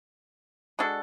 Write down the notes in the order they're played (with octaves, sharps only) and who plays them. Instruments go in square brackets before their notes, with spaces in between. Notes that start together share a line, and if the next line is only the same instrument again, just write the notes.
[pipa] G#3 D4 F#4 A4